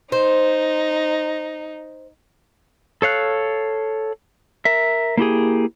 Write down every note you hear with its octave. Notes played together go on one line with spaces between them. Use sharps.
D#4 C5
A4 C#5 F5 F#6
A#4 E5
A#3 E4 G4 G#4